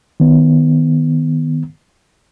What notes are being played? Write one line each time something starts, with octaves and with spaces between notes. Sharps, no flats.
D#3 B3